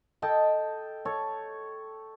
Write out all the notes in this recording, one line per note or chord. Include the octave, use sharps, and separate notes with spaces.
A4 D#5 G5 A5
A4 C#5